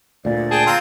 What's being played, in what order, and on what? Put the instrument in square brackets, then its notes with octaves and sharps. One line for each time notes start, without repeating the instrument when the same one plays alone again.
[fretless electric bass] D2 A#2 [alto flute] D5
[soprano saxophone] G#4 [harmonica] G5 A5
[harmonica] C4 F4 [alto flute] A#5